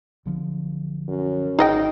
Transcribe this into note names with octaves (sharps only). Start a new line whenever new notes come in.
B1 D3 F3
F#2
G#1 D#4 G#4 D#5 G5